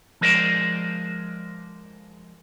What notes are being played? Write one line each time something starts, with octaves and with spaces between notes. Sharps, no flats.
F3 G#3 A#4 C5 D5